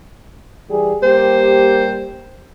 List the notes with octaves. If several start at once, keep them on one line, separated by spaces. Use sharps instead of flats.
E3 G3 G#4
G3 A#3 G4 C5